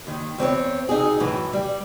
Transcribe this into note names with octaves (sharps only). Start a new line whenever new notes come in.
D#2 D#3
E2 C4 G#4 C#5
C3 D#4 F#4 G#4
F#2 A2 E3
G3